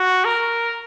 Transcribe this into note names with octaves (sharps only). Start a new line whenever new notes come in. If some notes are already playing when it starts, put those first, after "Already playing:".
Already playing: F#4
A#4